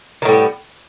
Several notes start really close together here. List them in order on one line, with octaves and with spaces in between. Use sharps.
D#3 A2 G3 B3